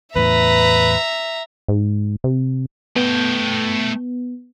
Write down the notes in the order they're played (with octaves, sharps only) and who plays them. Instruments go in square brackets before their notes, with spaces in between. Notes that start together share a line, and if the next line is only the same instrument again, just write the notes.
[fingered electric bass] E2 A2 [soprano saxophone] B4 [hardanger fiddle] E5 A#5
[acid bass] G#2
C3
[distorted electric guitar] A3 G5 [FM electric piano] B3